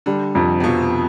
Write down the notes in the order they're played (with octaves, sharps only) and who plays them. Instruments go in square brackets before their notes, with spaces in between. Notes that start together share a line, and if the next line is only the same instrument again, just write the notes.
[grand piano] D3 [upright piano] G3
[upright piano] F2 [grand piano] C3
[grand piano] C3
[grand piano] B2 [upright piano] F3